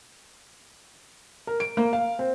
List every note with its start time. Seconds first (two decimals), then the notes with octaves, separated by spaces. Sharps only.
1.47 A#4
1.60 D7
1.77 A#3
1.93 F5
2.19 C4